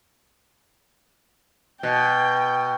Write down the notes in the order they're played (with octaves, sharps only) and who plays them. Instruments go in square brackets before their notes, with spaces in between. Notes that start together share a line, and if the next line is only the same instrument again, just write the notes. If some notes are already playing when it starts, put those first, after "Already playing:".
[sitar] B2 [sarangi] G5